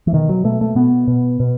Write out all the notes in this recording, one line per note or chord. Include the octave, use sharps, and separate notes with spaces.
E3
B2 D#3
F#3
B2 A3
A3
B2 B3
B2
B2